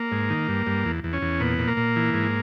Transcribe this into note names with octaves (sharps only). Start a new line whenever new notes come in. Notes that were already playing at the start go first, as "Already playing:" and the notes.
Already playing: A#3
G#2
D#3
G2
G2
E2
E2
C#4
E2
A#2 B3
A#2
A#3
A#2
E3
G#2